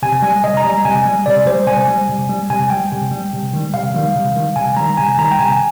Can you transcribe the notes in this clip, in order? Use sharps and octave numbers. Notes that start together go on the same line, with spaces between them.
C3 G#5
G3 G#5
C3 D#5
A#5
G3
C3 G#5
G3
C3 D5
G3 C5
C3 G#5
G3
C3
G3
C3 G#5
G3 G5
C3
G3
C3
D#3 G3
C3 F5
D#3 G3
C3
D#3 G3
C3 G#5
D#3 G3 A#5
C3 G#5
D#3 G3 A#5
G5
C3 G#5